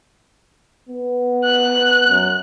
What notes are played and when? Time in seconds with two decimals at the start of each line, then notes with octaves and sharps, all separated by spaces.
0.89 B3
1.45 F#6
2.09 F#2